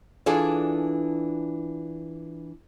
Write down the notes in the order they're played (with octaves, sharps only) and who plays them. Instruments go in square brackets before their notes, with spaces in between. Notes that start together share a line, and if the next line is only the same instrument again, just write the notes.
[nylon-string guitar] E3 D4 F4 G#4 A4 D5